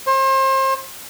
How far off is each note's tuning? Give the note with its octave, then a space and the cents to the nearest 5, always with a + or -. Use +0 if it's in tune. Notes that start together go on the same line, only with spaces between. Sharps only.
C5 +35